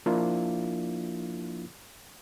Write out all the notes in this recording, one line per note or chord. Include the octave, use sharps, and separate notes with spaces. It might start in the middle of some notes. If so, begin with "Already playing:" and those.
F3 A#3 D4 E4 F4